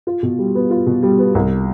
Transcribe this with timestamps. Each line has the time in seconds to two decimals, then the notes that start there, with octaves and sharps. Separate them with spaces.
0.07 F4
0.23 B2
0.39 G3
0.55 B3
0.70 F4
0.86 B2
1.03 G3
1.19 B3
1.35 C2